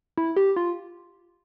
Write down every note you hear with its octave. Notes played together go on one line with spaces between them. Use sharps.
E4
G4
F4